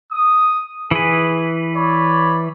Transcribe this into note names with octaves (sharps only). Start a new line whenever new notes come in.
D#6
E3 G#4 B4
C#5 D5 B5